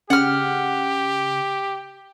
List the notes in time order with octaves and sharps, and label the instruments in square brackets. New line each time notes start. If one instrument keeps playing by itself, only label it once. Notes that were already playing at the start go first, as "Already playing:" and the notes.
[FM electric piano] C#3 [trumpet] G4 [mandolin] F#5 F6